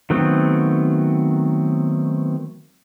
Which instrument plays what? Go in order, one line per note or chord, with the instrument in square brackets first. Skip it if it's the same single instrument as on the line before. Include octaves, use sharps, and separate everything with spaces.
[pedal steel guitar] D#3 F#3 A3 B3 C4